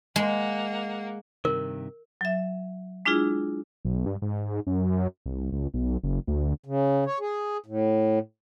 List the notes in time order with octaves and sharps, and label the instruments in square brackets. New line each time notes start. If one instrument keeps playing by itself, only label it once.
[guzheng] G#3 [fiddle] A#3 F#5
[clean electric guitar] G2 C3 D#3 [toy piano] A#4
[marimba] F#3 E5
G#3 D4 E4 F4 G#4
[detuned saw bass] B1
G2
G#2
F#2
C2
C#2
B1
F#1
D2
[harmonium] C#3
C#5
G#4
A2